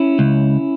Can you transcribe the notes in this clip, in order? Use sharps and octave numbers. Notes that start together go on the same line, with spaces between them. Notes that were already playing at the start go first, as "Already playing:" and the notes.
Already playing: C#4 E4
C#2